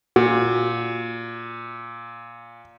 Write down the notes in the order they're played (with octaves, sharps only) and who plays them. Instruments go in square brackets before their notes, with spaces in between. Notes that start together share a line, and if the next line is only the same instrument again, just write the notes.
[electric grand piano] A#2 [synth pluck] F#4